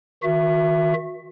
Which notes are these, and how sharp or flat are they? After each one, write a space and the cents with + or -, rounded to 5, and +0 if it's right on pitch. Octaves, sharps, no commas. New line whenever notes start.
D#3 +30 F#4 -30 E5 +20